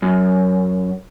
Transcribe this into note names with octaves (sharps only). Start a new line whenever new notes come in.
F#2